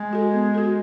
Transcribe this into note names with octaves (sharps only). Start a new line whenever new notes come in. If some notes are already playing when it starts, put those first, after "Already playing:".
Already playing: G#3
F#4 A4
B3
F#4 A4